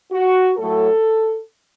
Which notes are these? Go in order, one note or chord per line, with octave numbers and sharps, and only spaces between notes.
F#4
A2 F#3 A3 A4